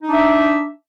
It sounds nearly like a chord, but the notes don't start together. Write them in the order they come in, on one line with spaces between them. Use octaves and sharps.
D#4 D4 E5